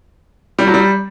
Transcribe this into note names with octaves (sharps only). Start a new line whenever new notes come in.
G3
F#3
G3